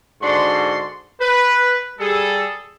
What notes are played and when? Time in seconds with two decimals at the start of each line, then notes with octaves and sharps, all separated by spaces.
0.21 G#2 D3 D4 F#4 C6
1.19 B4
1.99 G3 G#4 A4